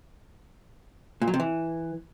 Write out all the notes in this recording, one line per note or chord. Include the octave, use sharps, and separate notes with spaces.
A#2
F#3
C3
E3